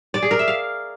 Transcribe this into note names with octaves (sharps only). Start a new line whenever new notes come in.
D5
G#4
A#4
E5
F5